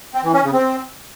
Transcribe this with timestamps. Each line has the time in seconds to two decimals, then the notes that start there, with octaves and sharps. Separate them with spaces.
0.14 C4
0.24 E3
0.33 C#4
0.43 C#3
0.53 C4